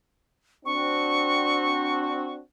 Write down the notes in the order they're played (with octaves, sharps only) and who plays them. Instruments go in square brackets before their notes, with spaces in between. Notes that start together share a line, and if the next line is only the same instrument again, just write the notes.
[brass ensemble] C4 D4 F#4 [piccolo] C#6